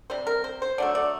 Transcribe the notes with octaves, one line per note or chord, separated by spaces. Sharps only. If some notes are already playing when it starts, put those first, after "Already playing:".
C3 G3 C5
A#4
C5
C5
D3 F#3 A3 D5
D5